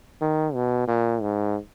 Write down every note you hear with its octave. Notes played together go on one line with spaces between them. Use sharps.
D#3
B2
A#2
G#2